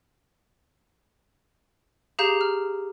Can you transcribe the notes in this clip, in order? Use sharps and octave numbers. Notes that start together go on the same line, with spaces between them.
G4 G#4 F5 A#5 G6 E7
F6